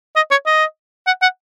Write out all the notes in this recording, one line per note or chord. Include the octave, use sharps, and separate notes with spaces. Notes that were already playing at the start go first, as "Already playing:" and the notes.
D#5
C#5
D#5
F#5
F#5